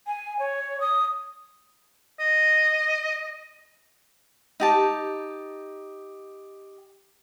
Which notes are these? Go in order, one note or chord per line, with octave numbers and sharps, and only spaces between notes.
G#5
C#5
D#6
D#5
D#4 G4 A5